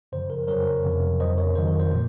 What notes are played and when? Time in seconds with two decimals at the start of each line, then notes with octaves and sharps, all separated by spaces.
0.12 F#2 C#3 F3 C5
0.30 A#4
0.48 F2 C#3 F#3 A#4 C#5
0.85 F2 C3 F3
1.20 F2 C#3 F#3 C5 D#5
1.38 A#4 C#5
1.55 F2 D#3 F#3 C5
1.67 A#4
1.79 C5
1.91 A#2 F3 C5